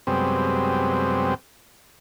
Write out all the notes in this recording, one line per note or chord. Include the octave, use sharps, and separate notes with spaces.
F#2 C3 G3 G#3 B3 C4